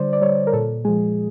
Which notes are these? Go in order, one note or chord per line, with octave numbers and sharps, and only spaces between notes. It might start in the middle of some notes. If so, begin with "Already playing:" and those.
Already playing: D3 G3 C5 D5
D5
G3 C#5
A#4
A#2 A4
F3 G#3 G#4